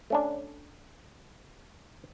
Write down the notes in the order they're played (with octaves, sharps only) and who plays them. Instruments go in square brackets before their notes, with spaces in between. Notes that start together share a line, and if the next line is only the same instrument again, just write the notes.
[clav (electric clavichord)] A3 C#4 D4